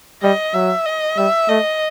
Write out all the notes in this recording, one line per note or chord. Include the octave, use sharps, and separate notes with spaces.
G3 D#5
F#3 E5
D#5
G3 E5
A3 D#5